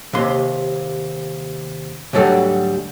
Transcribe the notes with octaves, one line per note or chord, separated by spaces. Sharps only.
D#2 C3 C6
D2 G#2 F#3 G3 A4